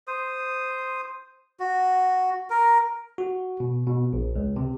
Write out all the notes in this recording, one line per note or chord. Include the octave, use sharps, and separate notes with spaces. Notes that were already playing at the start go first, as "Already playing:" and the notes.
C5 D#6
F#4
A#4
F#4
B2
B2
A#1
C#2
C3